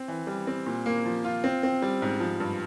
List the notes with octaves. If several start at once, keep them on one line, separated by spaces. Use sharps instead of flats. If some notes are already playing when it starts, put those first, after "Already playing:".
Already playing: C4
E3
G3
C4
A#2
A#3
F3
F4
C4
C4
G3
G#2
F3
G2